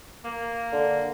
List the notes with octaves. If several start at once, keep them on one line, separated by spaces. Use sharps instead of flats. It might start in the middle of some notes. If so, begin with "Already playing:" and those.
A#3
D3